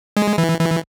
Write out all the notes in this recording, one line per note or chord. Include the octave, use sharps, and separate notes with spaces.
G#3
E3
E3